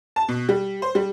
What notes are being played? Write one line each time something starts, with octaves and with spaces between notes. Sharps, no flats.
A5
B2
G3
C5
G3